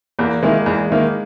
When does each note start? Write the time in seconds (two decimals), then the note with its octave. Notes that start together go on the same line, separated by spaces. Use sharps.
0.19 E2 A#3
0.42 D#3 G#3 A#3 E4
0.66 E2
0.91 D#3 A#3 E4